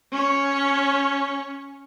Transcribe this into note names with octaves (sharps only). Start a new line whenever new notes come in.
C#4 C#5